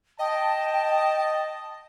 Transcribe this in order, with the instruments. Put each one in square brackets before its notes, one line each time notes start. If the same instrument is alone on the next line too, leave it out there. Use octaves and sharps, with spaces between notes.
[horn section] D#5 A5 [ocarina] G5